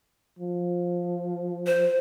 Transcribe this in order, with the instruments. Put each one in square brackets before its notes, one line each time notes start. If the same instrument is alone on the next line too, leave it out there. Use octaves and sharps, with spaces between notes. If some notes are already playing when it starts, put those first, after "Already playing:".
[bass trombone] F3
[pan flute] C5